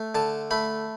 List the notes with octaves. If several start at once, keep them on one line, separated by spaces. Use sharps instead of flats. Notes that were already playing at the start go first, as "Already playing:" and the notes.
Already playing: A3
D3 A5
A3 B5